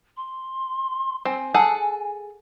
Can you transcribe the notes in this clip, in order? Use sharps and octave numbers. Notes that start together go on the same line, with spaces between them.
C6
C4 G#5
G#4 A4 F#5